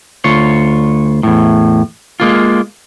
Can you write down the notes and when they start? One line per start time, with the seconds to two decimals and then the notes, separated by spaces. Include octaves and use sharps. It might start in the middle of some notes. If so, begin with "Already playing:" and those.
0.24 D2 F4 C#5
1.23 E2 A2
2.20 G#3 A#3 F4